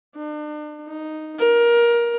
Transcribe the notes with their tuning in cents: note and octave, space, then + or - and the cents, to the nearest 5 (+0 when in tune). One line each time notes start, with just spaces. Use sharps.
D4 +40
D#4 -5
A#4 +20